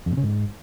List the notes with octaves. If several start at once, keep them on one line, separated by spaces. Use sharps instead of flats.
F2
A#2
C#3
G#2